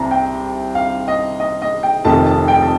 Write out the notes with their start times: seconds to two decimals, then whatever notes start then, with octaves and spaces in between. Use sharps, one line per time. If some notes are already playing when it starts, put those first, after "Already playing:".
Already playing: C2 C3 C4 A5 A#5
0.11 G5
0.75 F5
1.08 D#5
1.40 D#5
1.62 D#5
1.83 G5
2.05 F1 F2 D#3 A3 A5
2.26 A5
2.48 G5
2.62 A5